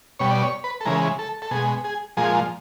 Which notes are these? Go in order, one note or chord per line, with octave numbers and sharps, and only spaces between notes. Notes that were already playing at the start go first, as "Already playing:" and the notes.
B2 G3 C#5
D5
C#5
B4
A4
C#3 E3 G#3 A#4
A4
A4
B2 G#3 G#4
G#4
A#2 F3 G#3 G#4